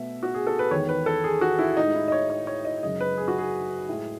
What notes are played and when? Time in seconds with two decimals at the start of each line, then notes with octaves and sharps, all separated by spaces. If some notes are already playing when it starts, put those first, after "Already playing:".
Already playing: B2 A3 E5
0.23 F#4
0.35 G#4
0.47 A4
0.59 B4
0.71 E2 D#3 G#3 C#5
0.89 B4
1.06 A4
1.24 G#4
1.41 F#4
1.59 E4
1.77 A2 G#3 D#4
1.95 E4
2.08 D#5
2.12 C#5
2.30 C#5
2.47 C#5
2.65 D#5
2.82 F#2 C#3 G#3 D#5
3.00 B4
3.18 G#4
3.28 F#4
3.38 G#4
3.89 A2 G#3